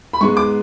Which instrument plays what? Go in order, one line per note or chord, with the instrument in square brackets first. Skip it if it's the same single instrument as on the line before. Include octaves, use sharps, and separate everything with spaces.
[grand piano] B5
G#2 G#3 B3 C#6
D6